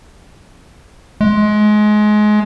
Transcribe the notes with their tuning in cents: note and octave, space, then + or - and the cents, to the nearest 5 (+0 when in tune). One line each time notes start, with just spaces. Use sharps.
G#3 +25